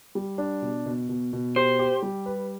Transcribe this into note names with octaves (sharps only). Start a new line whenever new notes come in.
G3
D4
B2
B2
B2
B2
G4 C5
G4
G3
B4